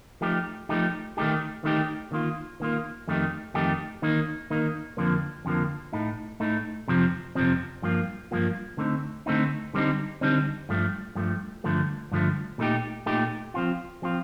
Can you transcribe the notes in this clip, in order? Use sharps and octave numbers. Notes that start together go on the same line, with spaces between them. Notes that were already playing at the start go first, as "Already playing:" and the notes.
F3 A3 D#4 G4
F3 A3 D#4 G4
D#3 A3 D#4 G4
D#3 A3 D#4 G4
D#3 A#3 F4
D#3 A#3 F4
F2 D#3 A3 D#4 G4
F2 D#3 A3 D#4 G4
D#3 A#3 D#4
D#3 A#3 D#4
F2 D3 F3 A#3
F2 D3 F3 A#3
A2 A3 D#4
A2 A3 D#4
F2 C3 F3 C4
F2 C3 F3 C4
G2 F3 A#3 F4
G2 F3 A#3 F4
D3 A3 C4 D#4
D3 A3 C4 D#4
D3 G3 C4 D#4
D3 G3 C4 D#4
G2 F3 A3
G2 F3 A3
G2 D3 F3 A3
G2 D3 F3 A3
A#2 A3 D#4 G4
A#2 A3 D#4 G4
F3 C4 F4
F3 C4 F4